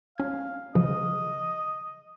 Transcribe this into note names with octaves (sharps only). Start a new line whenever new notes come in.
C#4 F5 G#6
C#3 F3 D#5